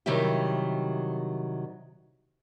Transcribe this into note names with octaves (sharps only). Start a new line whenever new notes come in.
C3 D#3 F#3 G3 E4 G4